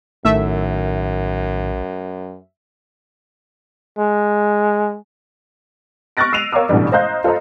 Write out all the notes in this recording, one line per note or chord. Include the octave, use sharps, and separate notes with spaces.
A#1 F#2 A2 D#3 A3 E5
G#3
C#6 F6 F#6 A6 A#6 D7
E6 C7 D7 D#7 F7
A#4 C#5 F5 A#5 D6 E6
A1 B2 D3 E3 G3
C5 D#5 F5 A#5 F#6 G6
F4 A4 C5 D#5 A#5